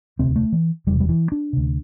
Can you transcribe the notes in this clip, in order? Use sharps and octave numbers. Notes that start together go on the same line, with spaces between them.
E1 D2 C3 C4
A3
E3
E1 E2 C3 G3
G3
E3
D4
D2 C3